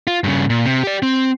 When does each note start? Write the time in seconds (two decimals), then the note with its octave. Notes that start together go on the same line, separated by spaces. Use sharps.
0.07 F4
0.24 G2 C#3
0.50 A#2
0.66 C3
0.84 G4 D5
1.03 C4